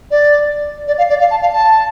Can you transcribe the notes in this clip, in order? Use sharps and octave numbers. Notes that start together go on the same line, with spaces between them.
D5
D5
F5
D5
F5
A5
F5
A5